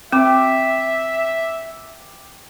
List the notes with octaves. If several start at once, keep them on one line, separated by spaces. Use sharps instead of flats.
C4 E5 G5 D6